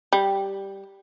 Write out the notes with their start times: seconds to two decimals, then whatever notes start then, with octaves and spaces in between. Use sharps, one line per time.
0.13 G3